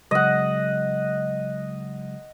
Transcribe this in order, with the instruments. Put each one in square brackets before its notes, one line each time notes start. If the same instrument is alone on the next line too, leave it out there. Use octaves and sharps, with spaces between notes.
[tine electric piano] C#3 F#3 G#3 [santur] D#5 F#5